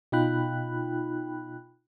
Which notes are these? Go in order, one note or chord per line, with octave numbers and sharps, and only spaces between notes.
B2 D#4 F4 G5 B5 F#6